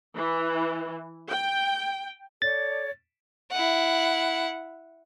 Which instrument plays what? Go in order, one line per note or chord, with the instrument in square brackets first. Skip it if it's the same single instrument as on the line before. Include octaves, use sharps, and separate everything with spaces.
[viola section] E3
G5
[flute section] A4 C#5 D5 [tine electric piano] A6
[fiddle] E4 F#5